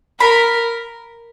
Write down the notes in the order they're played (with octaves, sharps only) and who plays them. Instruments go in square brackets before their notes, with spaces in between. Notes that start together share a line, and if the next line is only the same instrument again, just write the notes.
[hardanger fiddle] A#4 [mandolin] B5